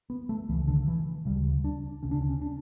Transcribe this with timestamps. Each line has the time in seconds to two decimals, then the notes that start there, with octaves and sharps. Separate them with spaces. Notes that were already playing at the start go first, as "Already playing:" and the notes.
0.10 B3
0.29 A3
0.49 C#2 C#3 E3
0.68 D3
0.88 E3
1.25 D2 C#3 G3
1.64 D4
2.03 D2 C#3 C#4
2.11 D4
2.21 C#4
2.41 D4